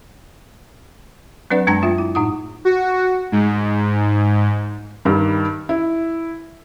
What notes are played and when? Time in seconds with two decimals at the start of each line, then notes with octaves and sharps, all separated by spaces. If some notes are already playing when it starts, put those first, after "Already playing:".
1.50 F#3 C4 D4 B4 D5 F#5
1.67 F#2 G#3 D4 A5 A#5 A#6
1.82 A3 F4 E5
1.98 E4
2.15 A2 D#4 F#5 D#6
2.65 F#4
3.32 G#2
5.05 G2 D#3 G3
5.69 E4